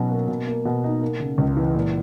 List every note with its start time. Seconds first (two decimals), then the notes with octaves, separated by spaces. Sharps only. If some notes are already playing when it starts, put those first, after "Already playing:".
Already playing: B2 F#3 C#4 D#4
0.11 A#3
0.28 B2
0.47 A#3
0.65 B2
0.84 D#4
1.02 A#3
1.20 C#3
1.38 C#2
1.57 E3
1.75 A#2